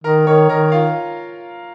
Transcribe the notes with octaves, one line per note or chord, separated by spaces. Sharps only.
D#3 A#4 A#5
D#3 C#5 C#6
D#3 A#4 A#5
F4 F5